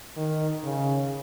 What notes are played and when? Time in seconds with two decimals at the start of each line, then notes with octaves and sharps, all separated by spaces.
0.17 D#3
0.63 C#3